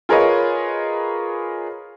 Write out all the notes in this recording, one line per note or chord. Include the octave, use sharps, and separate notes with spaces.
F4 G#4 A#4 B4 C#5 D#5